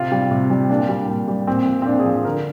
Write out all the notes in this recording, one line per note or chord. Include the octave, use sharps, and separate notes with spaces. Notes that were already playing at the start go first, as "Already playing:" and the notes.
Already playing: C3 F4
G3
C3
G3
A#2 D4
G3
A#2
G3
A#2 C4
F3
C4
A#2 D4
G#4
F3
D3 A#4